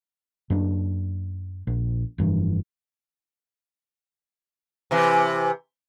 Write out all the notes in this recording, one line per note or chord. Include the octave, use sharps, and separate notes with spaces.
F#2 A#3 D4
A#1
F1 G2 E3
C3 E3